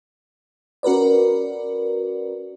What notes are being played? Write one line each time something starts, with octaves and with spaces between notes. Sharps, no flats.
C#4 F#4 A#4 B4 D5